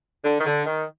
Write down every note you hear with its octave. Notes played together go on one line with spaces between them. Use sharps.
D3
D#3
D3
D#3